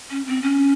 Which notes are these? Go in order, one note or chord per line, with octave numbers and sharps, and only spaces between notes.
C#4
C4
C#4